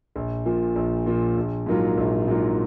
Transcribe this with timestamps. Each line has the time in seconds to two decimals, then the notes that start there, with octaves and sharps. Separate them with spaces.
0.16 A#1
0.46 A#2 F3
0.76 A#1
1.06 A#2 F3
1.36 A#1
1.66 G#2 F#3 A#3 F4
1.97 A#1
2.28 G#2 F#3 A#3 F4